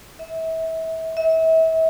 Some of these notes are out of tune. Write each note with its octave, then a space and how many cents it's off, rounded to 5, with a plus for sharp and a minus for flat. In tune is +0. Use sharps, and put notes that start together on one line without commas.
E5 -30
E5 -35